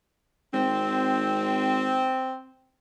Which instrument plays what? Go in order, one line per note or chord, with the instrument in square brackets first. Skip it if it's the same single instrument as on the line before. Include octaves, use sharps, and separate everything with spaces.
[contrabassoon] G#1 [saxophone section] C4